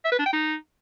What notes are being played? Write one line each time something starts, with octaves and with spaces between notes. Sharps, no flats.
E5
B4
D4
G5
D#4